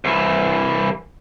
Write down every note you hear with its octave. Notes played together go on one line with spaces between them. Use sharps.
C2 E3